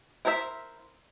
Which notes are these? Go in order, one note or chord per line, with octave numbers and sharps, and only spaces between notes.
E4 A#4 C5 C#5 E5